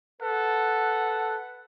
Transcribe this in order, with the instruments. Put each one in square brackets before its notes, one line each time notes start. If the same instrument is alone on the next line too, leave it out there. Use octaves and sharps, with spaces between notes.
[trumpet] A4 [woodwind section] B4 F#5